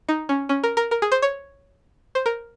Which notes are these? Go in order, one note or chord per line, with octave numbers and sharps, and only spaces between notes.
D#4
C#4
C#4
A#4
A#4
A#4
G#4
C5
C#5
C5
A#4